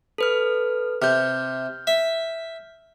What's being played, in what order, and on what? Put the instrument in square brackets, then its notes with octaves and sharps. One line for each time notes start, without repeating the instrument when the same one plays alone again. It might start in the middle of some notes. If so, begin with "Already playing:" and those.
[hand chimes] A4 B4 F6
[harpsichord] C3 [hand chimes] F6 G6
[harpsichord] E5